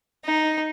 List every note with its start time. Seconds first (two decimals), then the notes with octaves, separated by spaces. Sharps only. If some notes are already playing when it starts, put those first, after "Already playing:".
0.25 D#4